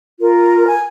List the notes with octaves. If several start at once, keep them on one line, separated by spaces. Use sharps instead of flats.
F4 A#4
G#5